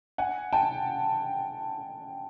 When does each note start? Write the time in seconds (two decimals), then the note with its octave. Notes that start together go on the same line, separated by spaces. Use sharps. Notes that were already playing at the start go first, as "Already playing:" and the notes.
0.18 F#5 G#5
0.53 G5 A5